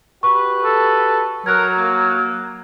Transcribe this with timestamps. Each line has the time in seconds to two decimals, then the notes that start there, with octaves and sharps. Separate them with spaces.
0.23 F#4 G4 B4 C#6
0.64 A4
1.46 F#3 A#4 F#6 G#6
1.77 A#3